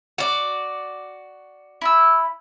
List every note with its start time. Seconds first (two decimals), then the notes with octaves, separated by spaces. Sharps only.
0.18 F#4 D5
1.81 E4 E6